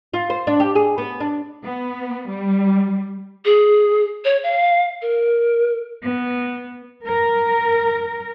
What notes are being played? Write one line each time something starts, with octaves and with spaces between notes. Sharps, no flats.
F4
C5
D4
G4
G#4
B3
D4
B3
G3
G#4
C#5
F5
A#4
B3
A#4